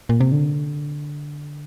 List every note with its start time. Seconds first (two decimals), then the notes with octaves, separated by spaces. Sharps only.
0.09 A#2
0.20 C3
0.32 D3